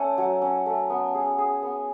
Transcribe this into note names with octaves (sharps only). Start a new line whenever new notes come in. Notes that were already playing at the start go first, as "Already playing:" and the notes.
Already playing: A3 C#4
F#3
C#4
A3
B3
G#4
G#4
B3